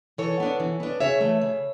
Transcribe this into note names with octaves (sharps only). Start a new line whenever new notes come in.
E3 A4 C#5
B3 D4
E3
B3 D4
C#3 C#5 E5
E3 A3
C#3